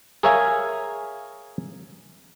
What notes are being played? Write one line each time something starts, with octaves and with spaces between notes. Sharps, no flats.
G#4 A#4 C#5 E5 F5 G#5